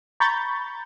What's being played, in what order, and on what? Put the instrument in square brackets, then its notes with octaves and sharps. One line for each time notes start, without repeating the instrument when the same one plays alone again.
[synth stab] A#5 B5 C#6 G6 A6